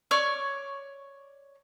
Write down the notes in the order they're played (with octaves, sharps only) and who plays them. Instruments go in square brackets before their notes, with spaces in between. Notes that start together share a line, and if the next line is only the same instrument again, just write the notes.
[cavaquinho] C#5 D5 C#6 D6